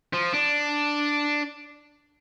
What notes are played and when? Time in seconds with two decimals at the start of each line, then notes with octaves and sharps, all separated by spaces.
0.13 F3
0.34 D4